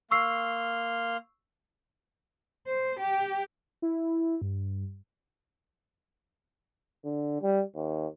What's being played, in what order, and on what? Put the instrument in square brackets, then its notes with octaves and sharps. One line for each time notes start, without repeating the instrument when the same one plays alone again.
[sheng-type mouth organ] A#3 C6 F6 [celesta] C#6 E6 C7
[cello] C5
G4 G5
[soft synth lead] E4
G2
[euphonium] D3
G3
D#2